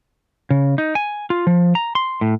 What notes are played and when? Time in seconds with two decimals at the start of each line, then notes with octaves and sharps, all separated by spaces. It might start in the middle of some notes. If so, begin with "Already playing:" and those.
0.50 C#3
0.78 D#4
0.95 G#5
1.30 F4
1.47 F3
1.75 A#5
1.95 C6
2.21 A2